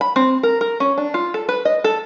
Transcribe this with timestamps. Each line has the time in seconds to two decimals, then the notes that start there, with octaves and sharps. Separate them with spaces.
0.01 B5
0.16 C4
0.43 A#4
0.61 A#4
0.80 C#4
0.98 D4
1.14 F4
1.34 A4
1.49 B4
1.65 D#5
1.84 A4